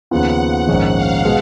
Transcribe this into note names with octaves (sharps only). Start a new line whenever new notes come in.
D#2 C#3 F3 B3 F4 F#5
F#5
A#1 G#2 D#3 G#3 C#4
F5
B2 G#3